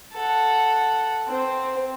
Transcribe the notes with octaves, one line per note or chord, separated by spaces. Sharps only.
A4 F#5
C4